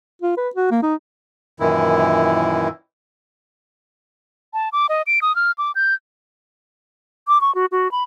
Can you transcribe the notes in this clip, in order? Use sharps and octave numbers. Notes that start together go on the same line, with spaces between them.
F4
B4
F#4
A#3
D#4
F#2 A#2 D#3 E3 E4
A5
D6
D#5
D7
D#6
F6
D6
G6
D6
C#6
F#4
F#4
B5